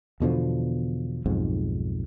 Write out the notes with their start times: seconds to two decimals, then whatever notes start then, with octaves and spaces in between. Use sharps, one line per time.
0.20 E2 B2 D3 F3
1.26 B1 F2 G#2